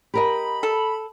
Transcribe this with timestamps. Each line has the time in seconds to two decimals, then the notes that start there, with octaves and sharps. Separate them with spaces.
0.14 G4 A#4 D#5 B5
0.63 A4